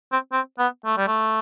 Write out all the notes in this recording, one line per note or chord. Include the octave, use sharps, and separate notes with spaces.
C4
C4
B3
A3
G3
A3